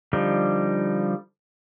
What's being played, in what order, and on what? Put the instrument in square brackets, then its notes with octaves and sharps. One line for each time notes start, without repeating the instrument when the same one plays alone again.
[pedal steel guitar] D3 F3 G3 D#4